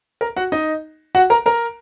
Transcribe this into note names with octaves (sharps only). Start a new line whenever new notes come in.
A#4 A#5
F#4 F#5
D#4 D#5
F#4 F#5
A#4 A#5
A#4 A#5